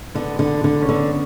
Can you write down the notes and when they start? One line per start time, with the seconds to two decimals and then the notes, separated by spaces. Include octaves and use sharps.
0.15 D3 B3
0.39 D3
0.64 D3
0.82 C#4
0.89 D3 B3